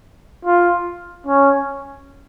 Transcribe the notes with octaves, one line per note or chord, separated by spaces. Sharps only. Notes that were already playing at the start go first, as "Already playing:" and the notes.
F4
C#4